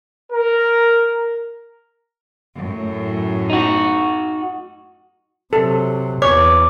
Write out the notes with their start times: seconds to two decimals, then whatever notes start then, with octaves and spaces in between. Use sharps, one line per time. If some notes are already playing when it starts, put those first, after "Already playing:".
0.33 A#4
2.56 F#2 A2
3.50 D#4 F#4
5.53 C3 F#3 A4
6.22 E2 C#5 D6